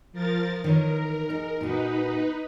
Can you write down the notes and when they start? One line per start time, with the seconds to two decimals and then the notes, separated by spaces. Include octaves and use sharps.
0.13 F3 A#4 A6
0.64 D#3 E3 A#4 C#5
1.30 D#4 G#4
1.61 A#2 D#4 F#4 B4